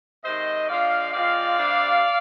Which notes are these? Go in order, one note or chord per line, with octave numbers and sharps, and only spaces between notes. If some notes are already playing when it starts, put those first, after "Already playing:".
C3 D#3 G#3 D#4 C5 D#5
F3 G#3 D4 F4 D5 F5
F3 G#3 C4 F4 D5 F5
C3 G3 D4